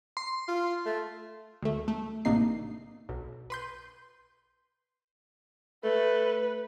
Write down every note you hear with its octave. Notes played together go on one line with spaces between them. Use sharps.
C6
F4
A3
D2 A3
A3
A1 C3 A#3 D4 D#4 C7
B1
B4 C6 G6
A3 B4